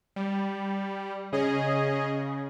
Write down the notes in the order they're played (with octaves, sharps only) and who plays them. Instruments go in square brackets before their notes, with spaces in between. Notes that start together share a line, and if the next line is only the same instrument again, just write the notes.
[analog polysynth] G3
[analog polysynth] C#3 [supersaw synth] C#4 G#4 D#5